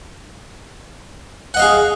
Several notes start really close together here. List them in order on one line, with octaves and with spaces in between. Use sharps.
F#5 D#5 F5 G#4